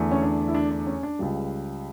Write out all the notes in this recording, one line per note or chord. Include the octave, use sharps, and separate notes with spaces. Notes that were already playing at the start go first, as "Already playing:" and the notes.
Already playing: E2 D3 A3
C#4
D4
E4
D4
D4
C#4
D4
C#2 C#3 G3